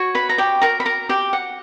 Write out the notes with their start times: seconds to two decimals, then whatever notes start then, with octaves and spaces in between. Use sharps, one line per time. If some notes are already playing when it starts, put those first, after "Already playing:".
Already playing: F#4 C#5
0.15 B4 B5
0.29 A#5
0.38 G4 G5
0.61 A#4 A#5
0.80 B5
0.86 A#4 A#5
1.09 G4 G5
1.33 F#5